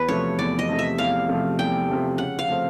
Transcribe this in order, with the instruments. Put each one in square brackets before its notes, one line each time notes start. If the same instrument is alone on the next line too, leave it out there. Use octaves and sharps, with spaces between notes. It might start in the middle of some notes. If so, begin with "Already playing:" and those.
Already playing: [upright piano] E2 [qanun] B4
[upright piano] C3 F3 A3 [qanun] C#5
[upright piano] E2 [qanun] D5
[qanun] D#5
[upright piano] C3 F3 A3
[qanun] E5
[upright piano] E2 [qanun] F5
[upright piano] C3 F3 A3
[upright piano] E2 [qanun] G5
[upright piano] C3 F3 A3
[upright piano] C#3 [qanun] F#5
[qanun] F5
[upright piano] F3 A3 C4